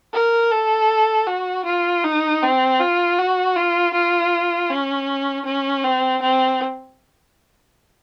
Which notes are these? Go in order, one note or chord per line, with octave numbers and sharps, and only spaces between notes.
A#4
A4
F#4
F4
D#4
C4
F4
F#4
F4
F4
C#4
C#4
C4
C4